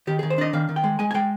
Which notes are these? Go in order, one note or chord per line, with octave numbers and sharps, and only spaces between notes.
D#3 G4
D#3 G#4
C5
D4 D#5
D#3 F5
D#3
G5
G#3
G#3 G#5
G#5
G#3 G5